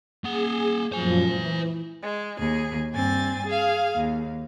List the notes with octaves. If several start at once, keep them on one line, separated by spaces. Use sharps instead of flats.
A#3 G#4 F#5
F#2 A#2 F3 C5 G#5
E3
G#3
D#2 G#4
G2 C4 G#5 A6
G#4 F5
D#2